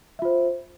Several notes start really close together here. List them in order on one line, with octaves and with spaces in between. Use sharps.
E5 F4 C5